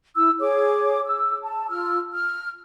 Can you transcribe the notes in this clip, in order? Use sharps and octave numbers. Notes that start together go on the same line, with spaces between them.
E4 E6
G#4 C#5 D6
E6
A5
F4 E6 F6
F6